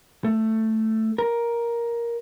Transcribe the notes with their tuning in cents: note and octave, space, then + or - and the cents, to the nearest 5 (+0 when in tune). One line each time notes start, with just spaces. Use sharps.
A3 +5
A#4 +10